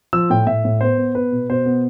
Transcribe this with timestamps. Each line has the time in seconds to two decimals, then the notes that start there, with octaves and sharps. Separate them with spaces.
0.13 F3 E6
0.30 A2 G5
0.47 A2 E5
0.65 A2
0.81 B3 C5
0.98 B3
1.15 B3 B4
1.32 B2
1.50 B2 C5
1.66 B3